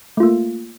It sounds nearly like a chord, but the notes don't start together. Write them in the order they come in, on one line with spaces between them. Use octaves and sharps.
A3 F4 A#3